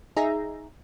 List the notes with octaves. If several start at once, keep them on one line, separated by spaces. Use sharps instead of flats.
D#4 G#4 E5 A#5